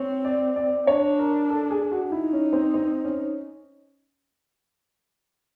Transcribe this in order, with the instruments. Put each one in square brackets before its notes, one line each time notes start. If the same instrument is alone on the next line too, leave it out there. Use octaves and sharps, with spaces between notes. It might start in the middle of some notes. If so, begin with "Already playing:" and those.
Already playing: [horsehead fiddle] C4 [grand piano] C#5
[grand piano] D5
D5
[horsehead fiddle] D4 [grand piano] C#5
[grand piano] A#4
A4
G#4
F#4
[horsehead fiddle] D#4 [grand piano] E4
[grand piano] C#4
C4
C4
C#4